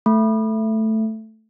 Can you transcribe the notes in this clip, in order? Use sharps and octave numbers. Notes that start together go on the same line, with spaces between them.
A3